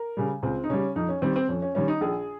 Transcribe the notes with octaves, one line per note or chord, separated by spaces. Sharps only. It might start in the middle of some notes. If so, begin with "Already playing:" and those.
Already playing: A#4
C#3 G3
C#2 C4
D#4
C#3 G3 C#4
F2 D#4
C#4
D#3 G3 C4
C4
F2 C#4
C#4
D#3 G3 C#4
D#4
A#1 G#4